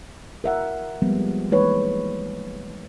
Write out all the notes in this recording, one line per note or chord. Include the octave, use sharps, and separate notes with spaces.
A#4 E5 F#5
F3 G3 G#3 A#3 B3
E3 G#3 A#3 D#4 B4 C#5